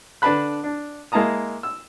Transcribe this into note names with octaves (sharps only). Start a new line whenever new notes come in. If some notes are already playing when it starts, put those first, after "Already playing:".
D3 D4 B4 A5 B5 F#6
D4
G#3 A#3 E4 A5 A#5 D#6
E6